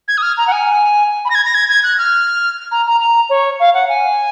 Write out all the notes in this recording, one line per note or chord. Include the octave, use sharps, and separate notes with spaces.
G#6
D#6
F6
A#5
F#5
G#5
B5
A#6
G#6
A#6
G#6
G#6
F#6
F6
A#5
A#5
A#5
C#5
F5
F#5
G#5